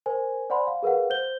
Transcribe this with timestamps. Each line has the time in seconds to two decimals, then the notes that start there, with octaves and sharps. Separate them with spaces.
0.06 A#4 C5 G#5
0.50 C5 D5 F#5 G#5 B5 C6
0.67 F5
0.83 G#4 A#4 B4 F5 F#5
1.10 C5 G6 G7